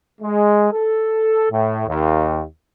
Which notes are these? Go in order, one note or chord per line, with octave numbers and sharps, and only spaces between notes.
G#3
A4
A2
D#2